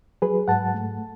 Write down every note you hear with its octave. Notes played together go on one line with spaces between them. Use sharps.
F#3 G#4 B4
G#2 F#5 A5
A3